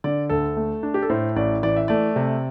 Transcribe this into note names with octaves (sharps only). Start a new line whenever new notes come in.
D3 D5
D2 A4
A3
D4
G4
A4
A2 C5
A1 D5
E3 D5
E5
A3 D5
C3